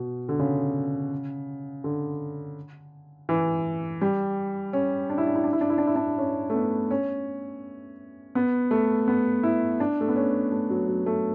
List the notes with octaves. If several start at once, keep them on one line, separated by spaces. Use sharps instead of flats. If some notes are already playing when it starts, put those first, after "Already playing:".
Already playing: B2
D3
C#3
D3
E3
G3
C#4
D4
E4
D4
E4
D4
E4
D4
E4
D4
E4
D4
C#4
A3
B3
C#4
B3
A3
B3
E4
D4
A3
B3
C#4
A3
F#3
F#3
A3